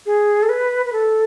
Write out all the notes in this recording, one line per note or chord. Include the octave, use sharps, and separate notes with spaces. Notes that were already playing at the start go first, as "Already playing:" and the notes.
G#4
A4
B4
B4
A4